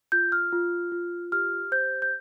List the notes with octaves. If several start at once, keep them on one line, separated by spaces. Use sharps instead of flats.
F4 G6
F6
F4
F4
G4 F6
C5 G6
G6